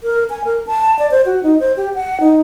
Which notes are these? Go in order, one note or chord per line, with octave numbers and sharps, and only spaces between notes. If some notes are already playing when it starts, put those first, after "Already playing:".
A#4
G#5
A#4
A5
D5
C5
F#4
D#4
C5
G4
F#5
D#4